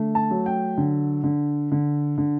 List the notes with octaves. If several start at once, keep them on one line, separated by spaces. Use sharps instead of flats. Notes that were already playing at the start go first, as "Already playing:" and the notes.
Already playing: D3 A3
A5
F#3
G5
D3
D3
D3
D3